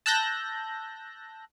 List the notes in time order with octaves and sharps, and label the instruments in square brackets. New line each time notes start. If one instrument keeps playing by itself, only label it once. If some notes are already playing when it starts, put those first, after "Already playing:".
[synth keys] A5 E6 F#6 G6 A#6